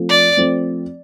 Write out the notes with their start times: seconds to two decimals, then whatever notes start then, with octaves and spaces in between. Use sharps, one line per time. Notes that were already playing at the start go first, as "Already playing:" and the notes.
Already playing: F3 A3 C4
0.09 D5
0.37 F3 A3 C4